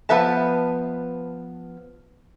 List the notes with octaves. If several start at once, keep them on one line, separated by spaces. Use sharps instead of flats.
F3 B3 B4 E5 A5